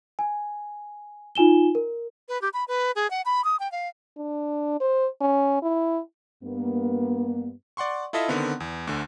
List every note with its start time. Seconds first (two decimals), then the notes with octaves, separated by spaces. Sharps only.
0.19 G#5
1.35 D#4 F4 G#5 E7 G7
1.75 A#4
2.28 B4
2.42 G4
2.53 B5
2.68 B4
2.96 G#4
3.10 F#5
3.25 B5
3.44 D#6
3.59 G5
3.72 F5
4.17 D4
4.81 C5
5.21 C#4
5.62 E4
6.44 G2 A#3 B3
7.77 D5 F#5 C6 C#6
8.13 E4 F4 A4 D#5 E5
8.28 D3 D#3 B3 C4
8.60 E2
8.87 D2 D3